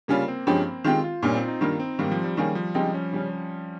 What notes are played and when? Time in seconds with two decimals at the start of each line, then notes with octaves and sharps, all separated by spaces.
0.08 C#3 G3 A#3 C#4 F4
0.28 C4
0.47 G2 F3 G#3 C#4 G4
0.84 D#3 G#3 C4 F4 G4
1.04 F4
1.23 A#2 G3 A#3 C#4 D#4
1.35 C4
1.48 D#4
1.61 G2 D#3 G3 A#3 D#4 F4
1.80 C4
1.99 G#2 D#3 G3 A#3
2.11 F3
2.24 G3
2.37 D#3 G3 A#3 C#4 G#4
2.55 F3
2.75 C#3 F3 G#3 C4 D#4 G4
2.94 C#4
3.13 C#3 G3 C#4